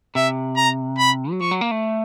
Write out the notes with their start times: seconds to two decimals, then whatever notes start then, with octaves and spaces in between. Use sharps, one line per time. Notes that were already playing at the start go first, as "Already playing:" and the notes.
0.15 C3 E5
0.57 A#5
0.99 B5
1.31 F#3
1.40 F3 C#6
1.51 F#3
1.61 A#3
1.71 A3